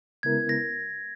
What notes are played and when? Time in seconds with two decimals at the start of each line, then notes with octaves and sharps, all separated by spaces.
0.23 C#3 G#3 B3 E4 A#4 G#6
0.49 A#6